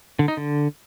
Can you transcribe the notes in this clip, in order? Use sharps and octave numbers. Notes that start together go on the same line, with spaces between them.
D3
D#4
D3